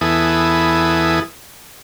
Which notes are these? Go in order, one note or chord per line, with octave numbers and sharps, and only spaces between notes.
E2 B3 E4 G#4 A4 D#6